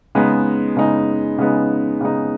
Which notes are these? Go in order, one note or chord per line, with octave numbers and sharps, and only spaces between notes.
C#3 G#3 B3 D#4
C#3 G#3 B3 D#4
C#3 G#3 B3 D#4
C#3 G#3 B3 D#4